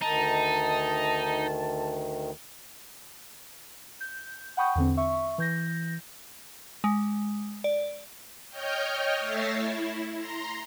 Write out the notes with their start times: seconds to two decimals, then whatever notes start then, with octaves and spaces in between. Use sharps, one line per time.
0.01 D2 D#3 D#4 A5
4.00 G6
4.57 F#5 G5 B5 C#6 D#6 G6
4.75 E2 D3 C4
4.97 E5 C#6
5.38 E3 G6 A#6
6.84 G#3
7.64 D5
8.49 C#5 D#5 G5 F6 G6
9.20 A3 C#5 E5 A6 A#6 C7
9.53 E4
10.16 A#5 C6